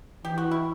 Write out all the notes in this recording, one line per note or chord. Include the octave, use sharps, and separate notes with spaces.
E3 G4
F#4
E4